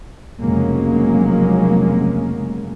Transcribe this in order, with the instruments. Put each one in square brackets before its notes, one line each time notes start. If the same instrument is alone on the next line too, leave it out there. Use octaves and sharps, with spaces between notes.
[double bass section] F1 C#3 F#3 G#3 A#3 C#4